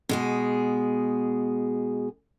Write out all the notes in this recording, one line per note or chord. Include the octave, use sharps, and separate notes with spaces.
B2 G#3 G#4